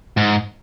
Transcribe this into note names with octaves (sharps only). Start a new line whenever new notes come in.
G#2